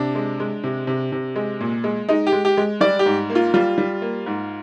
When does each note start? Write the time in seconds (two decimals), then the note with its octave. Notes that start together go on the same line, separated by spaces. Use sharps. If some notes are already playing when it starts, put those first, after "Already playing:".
Already playing: C3 D4
0.15 G#3
0.40 G#3
0.63 C3
0.87 C3
1.12 C3
1.36 G#3
1.60 A#2
1.84 G#3
2.09 G#3 D#4
2.27 G4
2.32 G#3
2.45 G4
2.57 G#3
2.81 G3 D5
2.99 G4
3.06 G#2
3.30 A#3
3.35 F4
3.54 G3 F4
3.78 G3
4.02 A#3
4.26 G#2